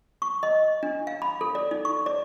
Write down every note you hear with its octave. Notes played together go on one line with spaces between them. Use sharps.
C#6
D#5
D4
F5
B5
A4
D5
D#4
C#6
D5